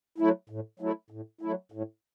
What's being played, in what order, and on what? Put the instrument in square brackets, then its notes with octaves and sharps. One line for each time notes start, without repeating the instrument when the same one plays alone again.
[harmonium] F#3 A3 E4
A2
F#3 A3 E4
A2
F#3 A3 E4
A2